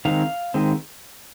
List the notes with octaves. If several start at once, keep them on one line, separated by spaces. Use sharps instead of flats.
D#3 G#3 C4 F5
D#3 G#3 C4